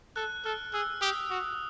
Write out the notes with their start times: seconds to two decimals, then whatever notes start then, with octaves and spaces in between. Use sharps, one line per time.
0.16 A4 F#6
0.45 A4 F6
0.74 G#4 E6
1.01 G4 D#6
1.30 F#4